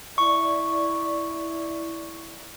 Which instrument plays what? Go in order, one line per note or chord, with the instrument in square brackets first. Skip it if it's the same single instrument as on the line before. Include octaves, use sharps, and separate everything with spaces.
[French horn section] E4 D5 [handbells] C#6